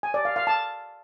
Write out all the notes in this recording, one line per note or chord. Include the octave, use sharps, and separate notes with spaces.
G#5
D5
F5
F5
A5